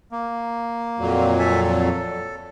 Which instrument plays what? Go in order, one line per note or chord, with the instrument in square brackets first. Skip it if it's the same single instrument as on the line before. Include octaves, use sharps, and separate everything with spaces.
[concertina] A#3
[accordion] F2 A#2 F#3
[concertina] A4 E5 G#5
A4